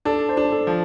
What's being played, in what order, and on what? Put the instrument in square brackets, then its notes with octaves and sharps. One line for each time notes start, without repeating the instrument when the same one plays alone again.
[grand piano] D4 [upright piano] A4
[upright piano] C5
[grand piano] D4
[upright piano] A4
[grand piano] F3